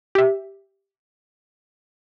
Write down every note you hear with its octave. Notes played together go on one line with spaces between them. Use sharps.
G4 E5